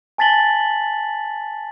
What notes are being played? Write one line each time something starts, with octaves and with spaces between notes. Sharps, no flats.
G#5 A5 A6 B6 F#7 G7